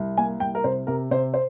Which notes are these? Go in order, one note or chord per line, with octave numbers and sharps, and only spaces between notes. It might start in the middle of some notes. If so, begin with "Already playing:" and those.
Already playing: C2
A#3 G#5
C2 G5
A#4
C3 C5
C3 A#4
C3 C5
C5